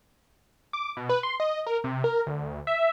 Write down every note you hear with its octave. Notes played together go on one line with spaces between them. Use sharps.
D6
B2
B4
C6
D#5
A#4
C3
A#4
D2
E5